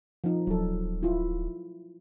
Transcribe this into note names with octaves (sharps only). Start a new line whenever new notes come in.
F3 D#4
D1 F#3 A4
E4 F4